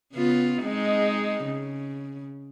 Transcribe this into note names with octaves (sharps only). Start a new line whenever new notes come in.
C#3 B3 F4
G#3 C4 D#4
C#3